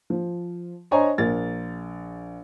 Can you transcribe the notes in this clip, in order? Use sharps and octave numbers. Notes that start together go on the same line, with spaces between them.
F3
D4 C5 C#5 D#5 G#5 A#5
A#1 A#4 A6